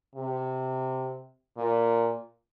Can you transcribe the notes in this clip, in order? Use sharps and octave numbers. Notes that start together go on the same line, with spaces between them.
C3
A#2